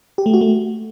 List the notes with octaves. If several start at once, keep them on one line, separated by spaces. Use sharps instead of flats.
G4
A3
F#4
A3